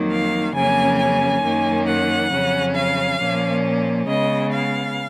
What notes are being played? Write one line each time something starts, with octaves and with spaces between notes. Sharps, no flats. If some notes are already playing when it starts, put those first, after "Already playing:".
Already playing: F2 D#3 F#3 A#3
F5
F2 C#3 F#3 A#3 C#4 G#5
G#5
F#2 D#3 A#3 C#4
F#5
F2 C#3 F#3 C#4
F5
A#2 F3 A#3 C#4
C#3 G#3 B3 D#5
F5